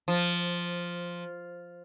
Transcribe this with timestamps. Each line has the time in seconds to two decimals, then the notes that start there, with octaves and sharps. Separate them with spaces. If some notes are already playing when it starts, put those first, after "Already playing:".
0.08 F3